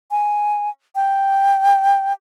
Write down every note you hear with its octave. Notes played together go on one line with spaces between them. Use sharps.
G#5
G5